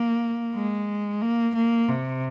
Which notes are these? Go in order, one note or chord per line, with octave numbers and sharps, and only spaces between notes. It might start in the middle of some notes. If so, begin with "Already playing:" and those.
Already playing: A#3
G#3
A#3
A#3
C3